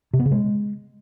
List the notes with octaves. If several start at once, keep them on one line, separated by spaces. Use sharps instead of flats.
C3
B3
C#3
G#3